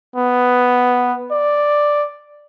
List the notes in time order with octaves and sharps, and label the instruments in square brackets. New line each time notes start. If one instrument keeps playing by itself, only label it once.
[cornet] B3
D5